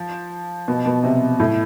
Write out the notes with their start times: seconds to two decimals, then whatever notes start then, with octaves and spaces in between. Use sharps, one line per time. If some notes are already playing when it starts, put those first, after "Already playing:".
Already playing: F3
0.68 B2
0.86 B2
1.04 C3
1.40 A2